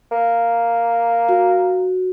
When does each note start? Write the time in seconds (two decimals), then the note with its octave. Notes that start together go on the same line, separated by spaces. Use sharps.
0.11 A#3
1.29 F#4